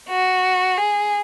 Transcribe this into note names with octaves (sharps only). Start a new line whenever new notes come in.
F#4
G#4